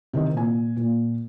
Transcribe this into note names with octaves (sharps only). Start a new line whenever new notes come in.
C3 D#3 C4 D#5
A#2 G#5
A#2